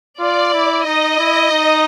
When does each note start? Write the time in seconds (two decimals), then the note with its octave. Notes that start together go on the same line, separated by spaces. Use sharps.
0.20 F4 D5
0.53 E4
0.86 D#4 D#5
1.19 E4
1.51 D#4